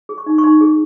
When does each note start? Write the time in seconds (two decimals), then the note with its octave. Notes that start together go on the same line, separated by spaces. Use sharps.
0.09 G#4
0.18 C#6
0.26 D#4
0.38 C#6
0.43 D#4 C6
0.61 G#4